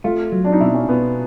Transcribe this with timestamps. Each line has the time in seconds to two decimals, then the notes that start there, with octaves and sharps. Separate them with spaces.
0.04 A3 F4
0.32 F#3
0.44 D4
0.52 D#4
0.60 B2 E4
0.74 C#4
0.89 B2 B3